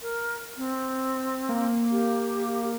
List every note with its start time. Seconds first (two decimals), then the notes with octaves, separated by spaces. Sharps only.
0.02 A#4
0.57 C4
1.49 A#3
1.91 G4